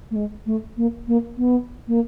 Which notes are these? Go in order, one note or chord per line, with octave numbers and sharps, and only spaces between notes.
A3
G#3
A3
A#3
A#3
B3
A#3